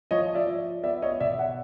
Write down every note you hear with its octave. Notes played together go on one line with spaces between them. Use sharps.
F3 C#5 D#5
D5 E5
F3
B3 D5 E5
C#5 D#5
B2 D5 E5
E5 F#5